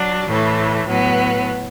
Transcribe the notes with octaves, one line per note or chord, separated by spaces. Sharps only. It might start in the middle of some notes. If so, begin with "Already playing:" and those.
Already playing: F#3 D4
A2 E3 A3
A2 F#3 B3